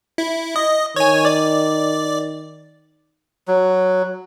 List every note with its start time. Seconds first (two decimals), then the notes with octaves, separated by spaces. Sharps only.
0.18 E4
0.56 D#5
0.96 D#3 C#5 G#5
1.25 D5
3.48 F#3